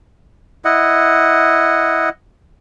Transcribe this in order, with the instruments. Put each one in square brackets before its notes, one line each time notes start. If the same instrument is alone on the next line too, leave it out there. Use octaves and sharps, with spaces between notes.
[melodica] E4 D#5 F#5